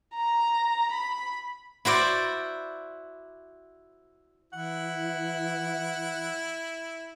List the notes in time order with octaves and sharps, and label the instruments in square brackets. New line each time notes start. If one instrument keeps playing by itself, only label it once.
[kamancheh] A#5
B5
[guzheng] E4 F#4 C5 D5
[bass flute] E3 [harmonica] E4 [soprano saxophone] F#5